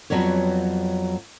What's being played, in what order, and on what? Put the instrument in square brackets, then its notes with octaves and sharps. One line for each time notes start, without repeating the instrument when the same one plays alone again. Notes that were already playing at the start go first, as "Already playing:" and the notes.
[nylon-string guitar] F2 F#3 G3 B3 C#5